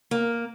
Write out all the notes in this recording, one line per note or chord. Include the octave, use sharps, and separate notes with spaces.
A#3